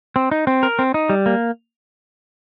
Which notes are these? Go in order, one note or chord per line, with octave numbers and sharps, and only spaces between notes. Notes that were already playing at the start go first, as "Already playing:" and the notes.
C4
D#4
C4
A#4
C4
D#4
G3
A#3